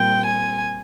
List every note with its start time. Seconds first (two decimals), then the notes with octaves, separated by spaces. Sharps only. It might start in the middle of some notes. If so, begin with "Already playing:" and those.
Already playing: A#2 G3 C4 G5
0.25 G#5